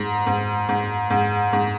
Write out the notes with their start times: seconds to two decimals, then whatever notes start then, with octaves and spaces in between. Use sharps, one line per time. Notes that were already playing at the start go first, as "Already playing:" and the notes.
Already playing: G#2
0.27 G#2
0.69 G#2
1.10 G#2
1.53 G#2